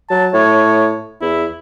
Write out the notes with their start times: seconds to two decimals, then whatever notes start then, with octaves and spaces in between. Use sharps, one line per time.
0.10 F#3 A5
0.33 A2 C#5
1.21 E2 E4